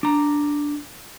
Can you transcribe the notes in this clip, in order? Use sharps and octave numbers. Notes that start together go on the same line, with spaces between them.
D4 A#5